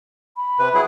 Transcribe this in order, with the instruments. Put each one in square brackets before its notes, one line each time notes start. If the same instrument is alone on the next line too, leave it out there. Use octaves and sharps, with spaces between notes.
[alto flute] B5
[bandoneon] C3 B4
F#3 E4 G#4